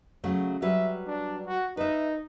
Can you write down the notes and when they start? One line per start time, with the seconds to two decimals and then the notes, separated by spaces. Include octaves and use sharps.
0.24 C#3 F#3 A3
0.62 F#3 G3 B4 E5
1.07 D4
1.47 F#4
1.77 D#4 B4 E5